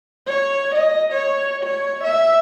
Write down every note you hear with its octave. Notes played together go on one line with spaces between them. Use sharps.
C#5
D#5
C#5
C#5
E5